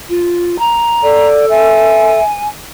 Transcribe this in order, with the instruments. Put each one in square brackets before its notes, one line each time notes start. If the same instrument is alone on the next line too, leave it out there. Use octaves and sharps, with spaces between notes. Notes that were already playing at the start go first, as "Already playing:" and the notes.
[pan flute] F4
A#5
[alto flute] A4 [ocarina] D5
[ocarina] E5 [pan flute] G#5